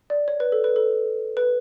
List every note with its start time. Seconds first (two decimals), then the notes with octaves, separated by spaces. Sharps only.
0.10 D5
0.28 C#5
0.40 B4
0.52 A4
0.64 B4
0.76 A4
1.37 B4